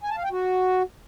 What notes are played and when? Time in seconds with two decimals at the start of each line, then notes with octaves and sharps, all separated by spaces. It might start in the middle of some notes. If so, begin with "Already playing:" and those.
0.03 G#5
0.10 A5
0.17 F5
0.24 G5
0.31 F#4